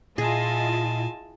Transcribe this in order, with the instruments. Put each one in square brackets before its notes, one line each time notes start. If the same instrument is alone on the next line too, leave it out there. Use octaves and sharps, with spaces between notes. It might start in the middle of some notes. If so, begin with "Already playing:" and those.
[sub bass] A#2 [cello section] E4 F4 D#5 [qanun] G#4 [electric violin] G#5 A5